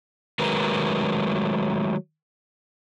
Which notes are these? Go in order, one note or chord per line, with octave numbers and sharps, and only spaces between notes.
D#3 F#3 G#3 A3 A#4 B4